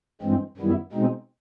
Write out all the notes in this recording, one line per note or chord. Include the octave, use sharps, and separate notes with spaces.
G2 E3 G#3 C4
F#2 D#3 G3 B3 E4
B2 G#3 C4 D#4